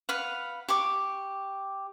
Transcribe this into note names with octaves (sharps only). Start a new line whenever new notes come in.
B4 F5 F#5
G4 C#6 D6